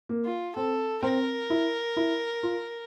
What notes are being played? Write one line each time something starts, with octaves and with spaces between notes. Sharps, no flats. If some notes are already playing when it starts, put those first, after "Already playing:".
A#3
F4
C4 A4
C4 A#4
E4
E4
F4